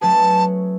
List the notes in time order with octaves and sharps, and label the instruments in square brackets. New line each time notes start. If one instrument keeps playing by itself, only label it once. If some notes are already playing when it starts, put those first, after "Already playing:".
[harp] F#3 A3 C#4 G#4 B4 [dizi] A5